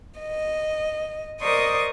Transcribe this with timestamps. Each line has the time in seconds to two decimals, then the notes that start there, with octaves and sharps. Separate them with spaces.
0.20 D#5
1.41 A#4 C5 D5 D#5 C#6 D#6